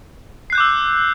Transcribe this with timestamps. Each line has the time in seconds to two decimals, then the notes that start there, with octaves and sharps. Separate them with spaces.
0.50 C7
0.53 F#6
0.55 G6
0.58 D6
0.60 E6